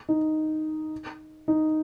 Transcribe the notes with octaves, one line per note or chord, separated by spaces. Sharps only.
D#4
D#4